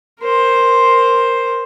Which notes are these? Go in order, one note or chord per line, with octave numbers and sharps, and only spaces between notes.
A#4 C5